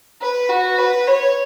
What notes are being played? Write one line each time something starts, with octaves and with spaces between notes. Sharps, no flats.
B4
F#4
B4
C#5